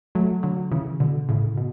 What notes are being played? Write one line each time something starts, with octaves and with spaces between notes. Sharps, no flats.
F#3 A3
D3 F#3
C#3 E3
B2 D3
A2 C#3
B2